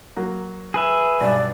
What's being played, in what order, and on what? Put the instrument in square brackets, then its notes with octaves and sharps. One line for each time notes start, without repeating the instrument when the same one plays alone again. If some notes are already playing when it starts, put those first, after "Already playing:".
[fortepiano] F#3 A#3
[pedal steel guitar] G#4 B4 E5
[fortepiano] B1 G2 [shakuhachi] D5